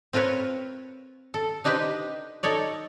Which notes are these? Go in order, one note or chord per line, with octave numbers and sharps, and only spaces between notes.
C4 F4 A#4 B4 C#5
A4
D4 D#4 G4 B4 C5
D#4 A4 C#5 D5